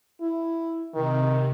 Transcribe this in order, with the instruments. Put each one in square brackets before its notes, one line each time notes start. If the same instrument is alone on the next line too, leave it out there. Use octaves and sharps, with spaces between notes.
[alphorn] E4
[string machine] C3 [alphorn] D#3